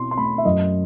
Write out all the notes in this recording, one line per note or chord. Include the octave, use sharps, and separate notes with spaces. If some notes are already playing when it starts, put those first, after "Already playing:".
Already playing: B2 C4 C6
C6
A3 B5
E5
F#2 D#5